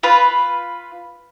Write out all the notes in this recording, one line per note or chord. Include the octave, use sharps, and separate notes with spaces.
F4 B4